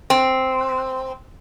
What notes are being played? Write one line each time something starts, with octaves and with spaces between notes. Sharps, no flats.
C4